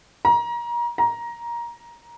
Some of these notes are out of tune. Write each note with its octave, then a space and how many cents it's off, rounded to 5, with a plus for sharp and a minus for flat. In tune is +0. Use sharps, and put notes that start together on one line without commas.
A#5 +30
A#5 +15